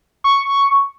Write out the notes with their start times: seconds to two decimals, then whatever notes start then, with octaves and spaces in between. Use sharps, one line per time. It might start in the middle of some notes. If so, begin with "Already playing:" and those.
0.24 C#6